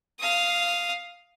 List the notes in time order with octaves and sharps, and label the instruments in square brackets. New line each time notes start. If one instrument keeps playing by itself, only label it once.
[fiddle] F5 D#6